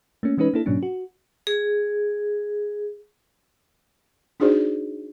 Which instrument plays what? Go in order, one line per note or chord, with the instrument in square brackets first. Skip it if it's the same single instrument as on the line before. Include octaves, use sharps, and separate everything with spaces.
[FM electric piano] A3 A#3 C#4
E3 G#3 C#4 D#4 B4
A#3 D4 E4 A4
G#2 B2 F#3 A#3 C#4 D4
F#4
[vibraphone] G#4
[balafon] D4 D#4 F#4 G#4 C5 D5